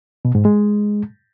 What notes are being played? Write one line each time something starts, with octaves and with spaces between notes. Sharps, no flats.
B2
G#2
G#3